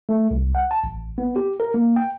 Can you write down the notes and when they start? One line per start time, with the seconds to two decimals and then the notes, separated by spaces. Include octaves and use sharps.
0.09 A3
0.31 C2
0.55 F#5
0.71 A5
0.84 A1
1.18 B3
1.36 G4
1.60 A#4
1.74 A#3
1.96 G5